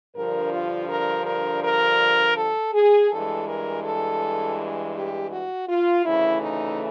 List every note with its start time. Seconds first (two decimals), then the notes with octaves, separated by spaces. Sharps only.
0.16 G2 D3 F3 A#4
0.52 F4
0.90 A#4
1.27 A#4
1.63 A#4
2.37 A4
2.73 G#4
3.10 G2 E3 G#3 A4
3.48 A#4
3.84 A4
4.95 G4
5.32 F#4
5.68 F4
6.05 D2 C#3 E3 A3 E4
6.41 D#4